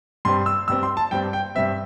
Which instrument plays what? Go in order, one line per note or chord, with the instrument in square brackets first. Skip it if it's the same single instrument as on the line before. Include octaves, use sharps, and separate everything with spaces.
[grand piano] G2 G3 C4 C6
E6
G2 G3 C4 E6
C6
A5
G2 G3 C4 G5
G5
G2 G3 C4 E5